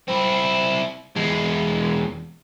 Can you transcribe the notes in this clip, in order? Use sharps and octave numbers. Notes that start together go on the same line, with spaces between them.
C4 E4
E2 G#3